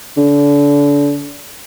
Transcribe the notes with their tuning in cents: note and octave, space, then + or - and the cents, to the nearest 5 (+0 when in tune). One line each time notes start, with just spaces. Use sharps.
D3 -30